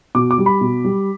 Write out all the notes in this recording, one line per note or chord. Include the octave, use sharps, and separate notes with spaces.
B2 D6
D6
G3
B5
B2
G3